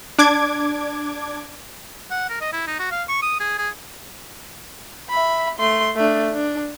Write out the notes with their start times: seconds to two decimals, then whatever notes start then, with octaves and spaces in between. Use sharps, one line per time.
0.19 D4 D6 G#6
2.11 F#5
2.29 A#4
2.41 D#5
2.53 E4
2.67 D#4
2.79 F#4
2.91 F5
3.09 C#6
3.22 D#6
3.40 G#4
3.58 G#4
5.10 E5 B5
5.59 A3 C6
5.97 A3 D4
6.32 D4